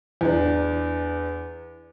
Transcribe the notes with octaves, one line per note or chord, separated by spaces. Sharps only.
E2 D4